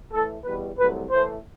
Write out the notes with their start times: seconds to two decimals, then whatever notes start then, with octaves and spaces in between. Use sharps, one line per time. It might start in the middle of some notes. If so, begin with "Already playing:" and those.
0.12 A2 E3 A3 A4
0.44 E2 B2 G3 B4
0.78 C2 C3 F#3 A3 B4
1.11 A2 E3 A3 C5